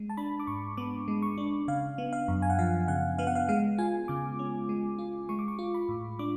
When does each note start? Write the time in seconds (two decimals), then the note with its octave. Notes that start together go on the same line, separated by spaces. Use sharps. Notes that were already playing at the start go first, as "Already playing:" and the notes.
Already playing: G#3
0.10 A5
0.17 D4 B5
0.40 D6
0.47 G#2 C#6
0.77 B3 D6
1.08 G#3
1.22 C#6
1.38 D4
1.68 C#3 F5
1.98 B3
2.13 F5
2.28 F#2
2.42 G#5
2.50 F#5
2.59 F3 F5
2.88 C#3 F#5
3.18 B3 F5
3.27 F#5
3.35 F5
3.49 G#3 F5
3.78 F4 G#5
4.08 C#3 D6
4.39 C#4
4.69 G#3
4.99 F4
5.29 G#3 C#6
5.39 D6
5.48 C#6
5.59 F4
5.74 B5
5.89 A2
6.19 D4 D6